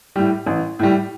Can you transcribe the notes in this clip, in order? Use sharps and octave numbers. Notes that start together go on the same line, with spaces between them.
A2 G3
A1
A2 G3